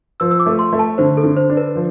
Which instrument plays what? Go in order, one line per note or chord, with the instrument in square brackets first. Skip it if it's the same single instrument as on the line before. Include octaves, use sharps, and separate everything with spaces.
[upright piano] F3 [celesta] E6
[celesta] E6
D6
[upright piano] A3
[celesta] C6
[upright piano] A3
[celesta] A5
[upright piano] D3 [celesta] C5
[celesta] A4
[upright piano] D3
[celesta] C5
[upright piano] D4
[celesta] B4
[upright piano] F3